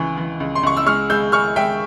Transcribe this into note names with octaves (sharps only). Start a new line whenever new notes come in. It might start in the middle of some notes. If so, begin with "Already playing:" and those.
Already playing: C#2 E3 C#6
E3
C#2
C6
C#2 C#6
E6
G#3 C#6 F6
G#3 E6 G6
G#3 C#6 F6
G#3 E5 G5